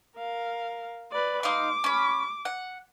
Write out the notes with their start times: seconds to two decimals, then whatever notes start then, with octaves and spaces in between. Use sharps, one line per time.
0.16 A#4 F5
1.12 B4 D5
1.43 D#4 F5 C6 D6
1.84 C#4 B5
2.45 F#5